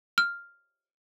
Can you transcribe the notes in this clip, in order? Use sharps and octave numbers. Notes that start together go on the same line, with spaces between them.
F6